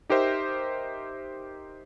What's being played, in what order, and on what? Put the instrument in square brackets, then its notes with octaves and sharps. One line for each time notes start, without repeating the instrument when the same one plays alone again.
[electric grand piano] D#4 G4 A#4 C5 E5